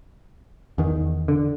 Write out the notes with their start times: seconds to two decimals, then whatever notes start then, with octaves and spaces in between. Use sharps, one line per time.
0.78 E2 D#3
1.28 D3